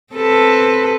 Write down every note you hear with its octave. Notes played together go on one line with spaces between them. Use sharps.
C4 A4 B4